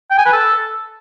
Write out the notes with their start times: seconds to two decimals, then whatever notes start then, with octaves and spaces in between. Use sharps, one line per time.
0.11 G5
0.18 G#5
0.25 B4
0.33 A4